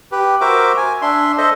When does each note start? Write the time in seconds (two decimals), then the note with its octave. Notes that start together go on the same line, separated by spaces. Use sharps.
0.12 G4 B4
0.41 F#4 A#4 C5 E5 D6
0.77 G#5
1.02 D4 E5 C6
1.38 A4 C5 D#5 E5